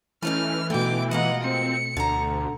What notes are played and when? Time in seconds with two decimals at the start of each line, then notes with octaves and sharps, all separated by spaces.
0.22 E3 A3 C#4 D#4 F6
0.70 B2 D3 A3 D#4 G5 D6
1.11 G#3 A#3 F4 D#5 F#5
1.44 C4 C#7
1.97 D2 D3 A#5